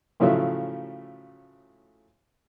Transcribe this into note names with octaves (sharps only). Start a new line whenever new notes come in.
A2 C#3 F3 F#3 A3 E5